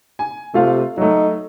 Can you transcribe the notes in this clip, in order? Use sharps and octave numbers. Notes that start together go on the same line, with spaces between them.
G#5
C3 A3 F4 F5
F#3 A3 D#4